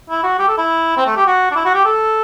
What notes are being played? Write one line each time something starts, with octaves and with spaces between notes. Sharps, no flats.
E4
F#4
G4
A4
E4
C4
A3
G4
F#4
D4
E4
F#4
G4
A4